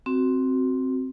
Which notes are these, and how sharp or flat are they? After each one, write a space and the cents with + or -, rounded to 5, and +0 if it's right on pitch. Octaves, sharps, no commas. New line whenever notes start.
C4 +0 F#4 +0